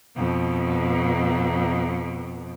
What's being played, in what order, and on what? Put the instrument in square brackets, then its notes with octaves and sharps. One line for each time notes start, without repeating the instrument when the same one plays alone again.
[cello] F2 B2